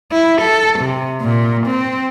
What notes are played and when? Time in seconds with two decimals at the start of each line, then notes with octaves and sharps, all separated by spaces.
0.12 E4
0.42 A4
0.80 C3
1.22 A#2
1.67 C4